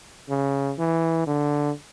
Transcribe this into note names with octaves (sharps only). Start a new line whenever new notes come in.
C#3
E3
D3